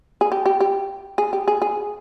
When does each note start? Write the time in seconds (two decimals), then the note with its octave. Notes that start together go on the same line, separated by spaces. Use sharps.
0.21 G#4
0.32 G4
0.46 G4
0.61 G4
1.18 G#4
1.33 G4
1.48 G#4
1.62 G#4